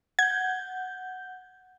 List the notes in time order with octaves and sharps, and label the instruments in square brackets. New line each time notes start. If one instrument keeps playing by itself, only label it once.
[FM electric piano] F#5 G6 [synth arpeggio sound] G#6